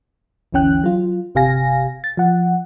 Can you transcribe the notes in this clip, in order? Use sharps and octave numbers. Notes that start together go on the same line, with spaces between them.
G1 D2 E3 C#4 G5 F#6
F#3 F4
G1 C3 G4 F5 G#5 A#6
A6
F3 F#5